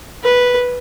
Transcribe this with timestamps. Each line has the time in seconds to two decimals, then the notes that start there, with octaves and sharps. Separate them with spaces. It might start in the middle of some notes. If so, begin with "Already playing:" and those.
0.24 B4